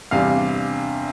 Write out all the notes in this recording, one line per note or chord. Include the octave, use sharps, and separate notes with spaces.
E2 C3 G3 D4 F5